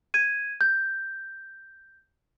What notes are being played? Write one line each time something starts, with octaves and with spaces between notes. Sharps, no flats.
G#6 D#7
G6